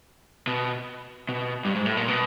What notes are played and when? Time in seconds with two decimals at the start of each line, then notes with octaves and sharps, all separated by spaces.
0.47 B2
1.29 B2
1.65 G2
1.75 G#2
1.86 A2
1.97 A#2
2.08 B2